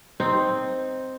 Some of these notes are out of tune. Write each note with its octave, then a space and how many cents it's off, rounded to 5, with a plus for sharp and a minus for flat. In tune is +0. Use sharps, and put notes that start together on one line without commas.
C4 +0 D#4 +0